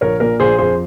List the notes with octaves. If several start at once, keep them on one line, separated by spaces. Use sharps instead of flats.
A#1 A#4 C#5
A#2 A#4
A#1 G#4 C5
F2 G#4 C5